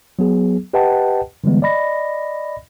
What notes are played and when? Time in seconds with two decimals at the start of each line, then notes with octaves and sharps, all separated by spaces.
0.19 F#3 B3 G#4
0.73 G4 B4 D#5 F#5 G5 A5
1.44 D3 E3 G3 G#3 B3
1.62 D5 D#5 B5 A#6